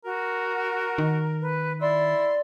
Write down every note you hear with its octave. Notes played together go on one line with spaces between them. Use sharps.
F#4 A#4
D#3
B4
E4 D5 C6